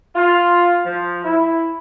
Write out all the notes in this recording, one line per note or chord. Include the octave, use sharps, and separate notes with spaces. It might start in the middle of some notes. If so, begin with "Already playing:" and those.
F4
F3
E4